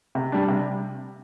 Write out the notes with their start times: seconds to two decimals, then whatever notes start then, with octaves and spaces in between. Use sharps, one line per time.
0.15 C3
0.32 G3 D4
0.48 C3